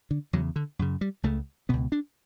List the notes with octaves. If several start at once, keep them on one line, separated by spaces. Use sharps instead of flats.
D3
E2 C#3 F#3
D3
F#2 C#3
G3
C#2 C#3 A3
C#2 B2 B3
D4